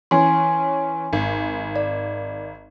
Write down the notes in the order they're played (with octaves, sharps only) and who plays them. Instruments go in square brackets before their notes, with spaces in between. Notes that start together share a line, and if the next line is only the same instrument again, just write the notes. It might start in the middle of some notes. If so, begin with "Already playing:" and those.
[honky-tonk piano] E3 C#4 [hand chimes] G#5 C6
[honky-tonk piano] G#1
[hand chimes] D5